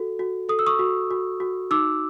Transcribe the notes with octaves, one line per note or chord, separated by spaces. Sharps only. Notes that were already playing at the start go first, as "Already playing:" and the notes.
Already playing: F#4 A4
F#4
A4 D#6
E6
C#6 D#6
F#4
F#4
F#4
D#4 D6 E6